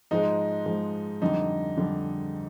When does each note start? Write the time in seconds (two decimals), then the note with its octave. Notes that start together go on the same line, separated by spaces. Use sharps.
0.11 G#2 F3 G#3 D#4
0.66 G#2 F3 G#3
1.22 F2 D3 G3 D#4
1.77 F2 D3 G3